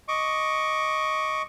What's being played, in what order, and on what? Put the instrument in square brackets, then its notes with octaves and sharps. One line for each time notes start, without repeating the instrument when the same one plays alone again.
[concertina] D#5 C#6 D6